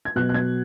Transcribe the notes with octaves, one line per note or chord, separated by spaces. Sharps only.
G#6
B2 F#3 F#6
F#6
G#6